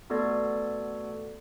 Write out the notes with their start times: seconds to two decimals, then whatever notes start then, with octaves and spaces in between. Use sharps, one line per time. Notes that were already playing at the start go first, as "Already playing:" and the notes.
0.10 A3 B3 F#4 A4 D5 G#6